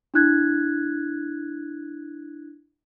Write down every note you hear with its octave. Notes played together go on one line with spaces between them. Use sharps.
D4 E4 F#6 G#6